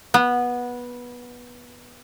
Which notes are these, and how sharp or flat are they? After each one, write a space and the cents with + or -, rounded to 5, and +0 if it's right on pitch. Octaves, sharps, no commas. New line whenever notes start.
B3 -15